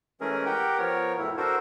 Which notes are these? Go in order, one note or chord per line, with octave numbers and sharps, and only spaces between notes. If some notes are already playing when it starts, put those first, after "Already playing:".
E3 G#3 A3 C#4 G#4 A#4
G4 A#4 F#5 G5
F3 B3 A#4 C#5
F#2 A2 C#3 E4
D4 F#4 A4 A#4 C5